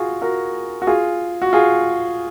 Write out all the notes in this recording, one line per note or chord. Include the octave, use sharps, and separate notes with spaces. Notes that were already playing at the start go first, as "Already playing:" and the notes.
Already playing: F4 F#4 G#4
F#4 A#4
F#4
F4 G#4
F#4
F4 G#4